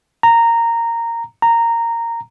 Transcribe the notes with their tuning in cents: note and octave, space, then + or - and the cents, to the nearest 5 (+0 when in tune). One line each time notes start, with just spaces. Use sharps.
A#5 -10
A#5 -10